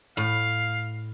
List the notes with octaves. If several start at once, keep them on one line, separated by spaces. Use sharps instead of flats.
A2 F5